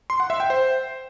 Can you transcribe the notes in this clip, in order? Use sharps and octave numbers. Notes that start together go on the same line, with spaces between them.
C6
F#5
E5
G5
C5